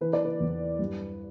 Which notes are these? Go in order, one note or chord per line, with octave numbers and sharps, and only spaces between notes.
E3 B4
D5
B4
E2
G2